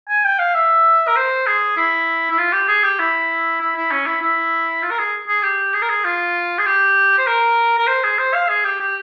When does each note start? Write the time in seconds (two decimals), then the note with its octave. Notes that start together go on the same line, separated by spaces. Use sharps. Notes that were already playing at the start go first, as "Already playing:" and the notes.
0.09 G#5
0.25 G5
0.39 F5
0.54 E5
1.07 A#4
1.16 C5
1.47 G#4
1.77 E4
2.30 E4
2.38 F4
2.53 G4
2.68 G#4
2.83 G4
3.00 E4
3.60 E4
3.75 E4
3.91 C#4
4.06 E4
4.21 E4
4.82 F4
4.91 A#4
4.98 G#4
5.28 G#4
5.43 G4
5.74 G#4
5.82 A#4
5.89 G#4
6.04 F4
6.58 G#4
6.65 G4
7.18 C5
7.27 A#4
7.78 A#4
7.87 C5
8.04 G#4
8.18 C5
8.34 F5
8.48 G#4
8.64 G4
8.80 G4